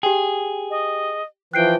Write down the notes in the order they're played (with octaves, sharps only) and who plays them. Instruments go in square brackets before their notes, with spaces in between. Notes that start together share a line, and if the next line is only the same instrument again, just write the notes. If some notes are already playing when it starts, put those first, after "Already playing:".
[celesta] G4 G5 [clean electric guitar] G#4
[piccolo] D#5
[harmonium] E3 F3 [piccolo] G5 [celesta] F#6 C7 D7